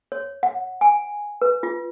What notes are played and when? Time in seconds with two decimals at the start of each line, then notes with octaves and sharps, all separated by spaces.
0.12 C#5
0.43 F#5
0.81 G#5
1.42 B4
1.63 F4